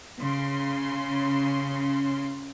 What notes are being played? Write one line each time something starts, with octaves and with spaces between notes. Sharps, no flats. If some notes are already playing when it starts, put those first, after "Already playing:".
C#3 C6